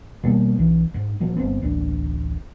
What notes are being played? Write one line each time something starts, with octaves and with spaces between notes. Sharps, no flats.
B2 G3 A#3
B1 E3
G#2
A#2 F3 F#3
G1 B2 B3 C4
D1 A1 D4